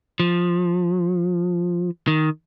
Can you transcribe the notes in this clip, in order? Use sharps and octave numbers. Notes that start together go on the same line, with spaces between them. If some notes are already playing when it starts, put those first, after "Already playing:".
F3
D#3